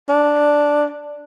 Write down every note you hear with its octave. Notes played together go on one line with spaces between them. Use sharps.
D4